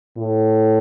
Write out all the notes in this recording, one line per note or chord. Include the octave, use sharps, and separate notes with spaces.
A2